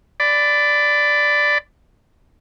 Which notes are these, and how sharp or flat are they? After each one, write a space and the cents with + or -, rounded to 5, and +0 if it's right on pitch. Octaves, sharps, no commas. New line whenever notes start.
D5 +0 B5 +25